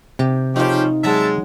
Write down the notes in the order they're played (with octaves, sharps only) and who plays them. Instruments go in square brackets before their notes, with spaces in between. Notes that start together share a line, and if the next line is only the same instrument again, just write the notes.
[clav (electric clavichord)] C3 [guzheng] G4
[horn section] C#3 C#4 G4 [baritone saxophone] F3 [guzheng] D#4 F4
[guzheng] F#3 A#5 [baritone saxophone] G#3 [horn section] E5 A5